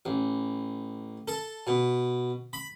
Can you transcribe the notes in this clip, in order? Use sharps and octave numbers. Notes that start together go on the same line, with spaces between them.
A1
A4
B2
B5